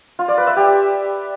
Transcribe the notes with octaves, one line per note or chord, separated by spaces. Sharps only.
F4
D5
B4
E5
G4